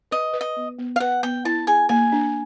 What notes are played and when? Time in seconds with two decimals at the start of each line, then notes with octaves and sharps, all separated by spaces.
0.11 B4 D#5
0.33 B4
0.41 D#5
0.57 B3
0.78 B3
0.96 F5
1.00 B4 F#5
1.23 B3 G5
1.45 E4 A5
1.67 G#4 G#5
1.89 A#3 G#5
2.12 D4